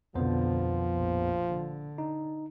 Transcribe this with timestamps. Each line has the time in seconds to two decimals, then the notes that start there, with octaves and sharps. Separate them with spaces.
0.15 B1 F2 D3 F3 B3 C5
0.97 A#1
1.50 D3
1.98 D#4